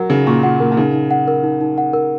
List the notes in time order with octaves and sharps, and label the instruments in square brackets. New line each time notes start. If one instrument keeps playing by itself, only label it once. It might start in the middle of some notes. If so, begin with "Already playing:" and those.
Already playing: [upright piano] F#3 [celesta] A#4 F#5
[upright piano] C#3 [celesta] D#4
[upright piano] A#2 [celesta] C#6
[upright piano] A#2 [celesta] F#5
[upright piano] A#2 [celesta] A#4
[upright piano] A#2
[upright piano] C#3 [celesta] D#4
[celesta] D#4
F#5
A#4
D#4
D#4
F#5
A#4